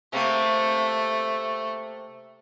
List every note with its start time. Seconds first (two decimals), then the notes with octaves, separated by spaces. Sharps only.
0.13 C3 A3 A#3 C4